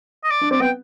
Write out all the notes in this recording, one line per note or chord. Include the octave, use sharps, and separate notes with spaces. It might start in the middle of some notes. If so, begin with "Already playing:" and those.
D#5
D5
D4
C4 D5
B3 G5